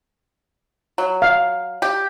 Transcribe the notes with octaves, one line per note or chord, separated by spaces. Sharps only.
F#3
F5
G4